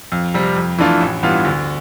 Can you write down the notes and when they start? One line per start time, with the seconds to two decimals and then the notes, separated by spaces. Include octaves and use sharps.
0.12 F2
0.34 C3 G3
0.56 F2
0.78 E3 A3 D4 F4
1.01 A1
1.23 G2 E3 B3 F4
1.45 D2